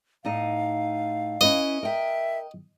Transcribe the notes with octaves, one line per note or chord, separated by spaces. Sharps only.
A2 D#4 D#5 F5
C#4 E4 B4 D#5
A#4 E5 G5